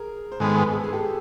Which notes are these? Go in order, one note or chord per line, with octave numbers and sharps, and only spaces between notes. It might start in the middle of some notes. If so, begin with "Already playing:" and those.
Already playing: G#4 A#4
C5
G#2 D#3 G#3 B3 A4 B4
A4
G#4
G4 A4